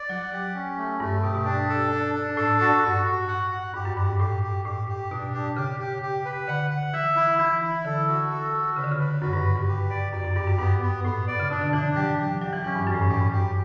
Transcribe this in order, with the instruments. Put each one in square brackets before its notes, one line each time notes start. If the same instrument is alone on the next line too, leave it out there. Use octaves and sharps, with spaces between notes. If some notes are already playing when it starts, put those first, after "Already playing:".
Already playing: [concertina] D5
[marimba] F#3 [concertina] F#5
[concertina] G4
C#4
A3
[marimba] G2 [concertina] A3
[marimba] G2
[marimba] B2 [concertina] G4
[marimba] B2
[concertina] D4
A4
D4
D4
[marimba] A2 [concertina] A4
[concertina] F#4
[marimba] G2 [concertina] F#4
[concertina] F#4
F#5
F#5
[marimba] G2 [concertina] G4
[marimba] F#2
[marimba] G2 [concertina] G4
[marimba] G2
[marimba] A2 [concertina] G4
[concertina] G4
[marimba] A2 [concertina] G4
[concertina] G4
[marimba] B2 [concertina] D4
[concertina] G4
[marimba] C#3 [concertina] G4
[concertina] G4
G4
B4
[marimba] D3 [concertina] F#5
[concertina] F#5
[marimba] E3 [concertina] E5
[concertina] E4
[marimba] E3 [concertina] E4
[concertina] E4
[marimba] D3 [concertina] A4
[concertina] F#4
A4
F#4
[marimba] C#3 [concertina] B4
[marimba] D3
C#3
[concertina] B4
[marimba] F#2 [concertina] F#4
[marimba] G2
[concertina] B4
[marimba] G2
[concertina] G4
D5
[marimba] F#2 [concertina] D5
[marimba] F#2
[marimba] G2 [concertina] G4
[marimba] F#2
[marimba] G2 [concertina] B3
[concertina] B3
[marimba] A2 [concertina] B3
[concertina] D5
[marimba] C#3
[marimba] B2 [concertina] D4
[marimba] D3
[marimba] E3 [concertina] D4
[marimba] F#3 [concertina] G4
[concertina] G4
[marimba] F#3 [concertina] G4
[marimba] E3
[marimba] E3 [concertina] C#4
[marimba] G2
[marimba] F#2 [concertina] C#4
[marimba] A2
G2
[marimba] A2 [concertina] G4
[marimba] G2
[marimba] F#2 [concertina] G4